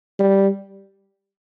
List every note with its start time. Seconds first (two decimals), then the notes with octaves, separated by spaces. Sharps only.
0.19 G3